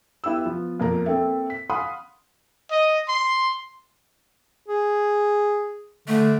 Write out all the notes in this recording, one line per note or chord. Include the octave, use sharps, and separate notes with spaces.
B3 E4 G4 E6
F3 B3
F2 A#2 A#4 A#5
A#3 C4 A4 E5
B6
F5 F#5 G#5 B5 C6 D#6
D#5
C6
G#4
D3 A3